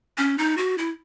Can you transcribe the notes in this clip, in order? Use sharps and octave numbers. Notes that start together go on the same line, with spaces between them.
C#4
D#4
F#4
E4